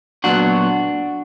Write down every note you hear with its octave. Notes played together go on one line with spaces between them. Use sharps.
A#2 F#3 B3 D4 F#4